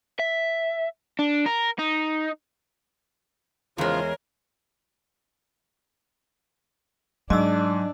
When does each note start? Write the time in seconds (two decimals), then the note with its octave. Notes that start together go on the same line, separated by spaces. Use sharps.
0.19 E5
1.19 D4
1.46 A#4
1.79 D#4
3.78 E2 C#3 F3 G#3 F4 A#4 C#5
7.30 G#2 F#3 D4 D#5 E6